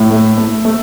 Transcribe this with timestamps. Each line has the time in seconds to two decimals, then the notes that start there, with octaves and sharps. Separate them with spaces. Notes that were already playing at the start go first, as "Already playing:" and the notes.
Already playing: A2
0.10 A3
0.38 A3
0.65 A3